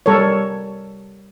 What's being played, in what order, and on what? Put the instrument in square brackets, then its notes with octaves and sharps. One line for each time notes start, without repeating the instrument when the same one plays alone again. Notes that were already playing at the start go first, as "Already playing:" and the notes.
[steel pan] G3 A4 A#4 C#5